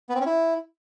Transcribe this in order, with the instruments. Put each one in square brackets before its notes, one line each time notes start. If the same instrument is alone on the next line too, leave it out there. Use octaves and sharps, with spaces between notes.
[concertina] B3
C4
C#4
E4